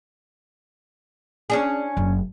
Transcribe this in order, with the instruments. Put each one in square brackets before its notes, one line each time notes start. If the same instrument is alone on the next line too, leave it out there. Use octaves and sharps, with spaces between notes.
[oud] C#4 D4 G#4
[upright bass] F#1